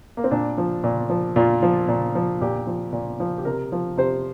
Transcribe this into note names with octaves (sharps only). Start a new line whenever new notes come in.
A#3
C4
A#2 D4
F3
A#2
F3
A#2 F4
F3
A#2
F3
A#2 G4
F3
A#2
F3
G4
C3 A#4
F3
C3 C5